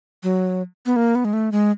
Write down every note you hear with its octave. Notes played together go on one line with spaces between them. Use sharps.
F#3
B3
A#3
B3
G#3
A3
G#3